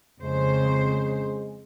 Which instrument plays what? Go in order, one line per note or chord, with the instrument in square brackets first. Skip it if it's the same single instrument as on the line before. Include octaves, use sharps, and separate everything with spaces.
[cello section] F2 C#3 C5 [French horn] G#3